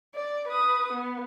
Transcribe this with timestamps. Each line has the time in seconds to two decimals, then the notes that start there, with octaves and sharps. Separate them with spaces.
0.15 D5
0.48 B4 D#6
0.93 B3